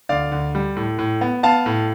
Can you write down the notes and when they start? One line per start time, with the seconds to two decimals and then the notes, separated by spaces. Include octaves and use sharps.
0.09 D2 D5 F5
0.32 D2
0.55 G3
0.76 A2
0.99 A2
1.21 B3
1.43 B3 F5 A5
1.66 A2